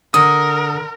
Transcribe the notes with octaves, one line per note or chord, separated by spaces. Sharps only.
D3 A#4 D#6